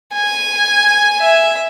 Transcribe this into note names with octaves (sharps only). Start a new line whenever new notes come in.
G#5
E5